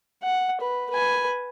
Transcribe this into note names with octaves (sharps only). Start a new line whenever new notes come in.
F#5
B4
B4 G#5